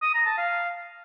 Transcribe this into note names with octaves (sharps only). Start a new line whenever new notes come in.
D#6
A#5
A5
F5